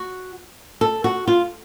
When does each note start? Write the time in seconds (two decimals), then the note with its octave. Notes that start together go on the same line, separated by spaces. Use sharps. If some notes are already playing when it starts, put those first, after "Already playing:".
Already playing: F#4
0.81 A4
1.04 F#4
1.28 F4